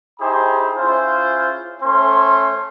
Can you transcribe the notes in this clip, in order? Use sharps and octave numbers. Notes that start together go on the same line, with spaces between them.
D#4 E4 G4 G#4 C5 B5
C#4 E4 F4 G#4 C5
A3 C#4 C5 C6